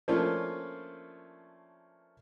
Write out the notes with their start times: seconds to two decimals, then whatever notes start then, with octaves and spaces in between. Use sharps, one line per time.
0.08 F3 A3 A#3 C#4 D4 F4